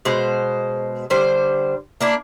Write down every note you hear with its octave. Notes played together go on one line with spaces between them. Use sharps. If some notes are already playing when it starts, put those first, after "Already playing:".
B2 G#3 C5
D3 G3 C5
A#3 D4 E4